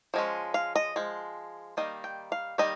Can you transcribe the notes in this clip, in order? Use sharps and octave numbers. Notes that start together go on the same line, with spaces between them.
F3 G#3 C#4
F5
D#5
F3 G#3
D#3 G3 A#3 D#5
G5
F5
D#3 G3 A#3 D#5